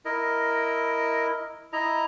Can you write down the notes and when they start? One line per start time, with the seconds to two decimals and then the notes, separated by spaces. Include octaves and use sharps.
0.05 E4 A#4 D#5
1.73 E4 D#5 A#5